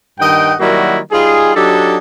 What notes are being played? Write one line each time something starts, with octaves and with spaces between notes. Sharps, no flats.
G2 D#3 D#5 F#5 G5
D#3 F#3 G3 A#3 E4 F#4
G3 D#4 F4 G#4
F#3 D4 D#4 G4 A4